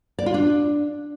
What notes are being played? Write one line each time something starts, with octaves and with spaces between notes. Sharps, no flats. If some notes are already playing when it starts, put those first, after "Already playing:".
D5
F4
D4